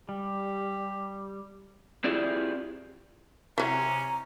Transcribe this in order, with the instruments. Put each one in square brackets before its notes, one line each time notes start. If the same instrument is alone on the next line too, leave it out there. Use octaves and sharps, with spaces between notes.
[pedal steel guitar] G3 [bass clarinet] G4
[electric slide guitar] C4 E4 F4 G4 G#4 D5
[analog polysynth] C3 [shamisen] E3 F#3 [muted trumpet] C#4 [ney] A#5